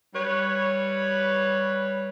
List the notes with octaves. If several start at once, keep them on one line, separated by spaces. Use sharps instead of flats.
G3 B4 C#5